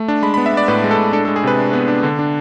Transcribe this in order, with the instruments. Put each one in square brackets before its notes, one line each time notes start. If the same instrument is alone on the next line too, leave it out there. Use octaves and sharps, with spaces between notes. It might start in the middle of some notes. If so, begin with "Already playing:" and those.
Already playing: [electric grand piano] A3
D4
G#3 B5
B5
B3
E5
B3 D5
A2 B4
G#3
A4
A2
D4 A4
G#3 A4
G#4
C3 B4
D4
B3
D4
D3
D4